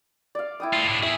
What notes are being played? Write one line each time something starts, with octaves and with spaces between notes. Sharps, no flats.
D5 F5
E4 G5 D#6
A2 F4
A2 D4
E4 G#4 E5 C#6